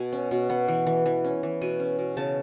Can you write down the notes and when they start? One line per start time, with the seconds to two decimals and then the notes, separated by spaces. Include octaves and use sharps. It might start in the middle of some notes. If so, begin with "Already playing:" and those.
Already playing: B2 G#5
0.13 C#4
0.31 B2
0.50 B3
0.68 E3
0.87 E3
1.06 E3
1.24 C#4
1.43 E3
1.61 B2 G#5
1.80 C#4
1.99 B2
2.17 C#3 A5